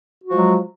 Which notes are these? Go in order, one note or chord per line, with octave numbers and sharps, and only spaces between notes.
F3 F#3 G#3 F#4